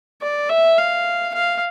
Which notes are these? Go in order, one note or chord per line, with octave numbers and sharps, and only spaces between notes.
D5
E5
F5
F5